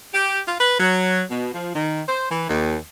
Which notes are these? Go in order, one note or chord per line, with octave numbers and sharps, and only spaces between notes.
G4
F4
B4
F#3
B2
F3
D#3
C5
E3
D#2